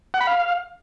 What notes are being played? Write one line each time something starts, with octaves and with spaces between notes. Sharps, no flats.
F#5
B5
F5